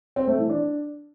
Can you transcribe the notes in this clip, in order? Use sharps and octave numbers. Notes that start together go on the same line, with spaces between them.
C4
A3
E3
D4